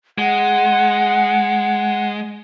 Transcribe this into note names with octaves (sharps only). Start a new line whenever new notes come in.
G#3 F#5